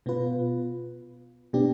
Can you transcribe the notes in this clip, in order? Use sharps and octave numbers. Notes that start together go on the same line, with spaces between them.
B2 B3 F4 B4
B2 B3 D4 G4